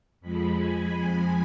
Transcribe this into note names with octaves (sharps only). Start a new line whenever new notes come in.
F2 F3 G#3 B5
G#5